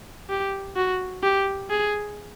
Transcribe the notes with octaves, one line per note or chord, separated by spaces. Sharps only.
G4
F#4
G4
G#4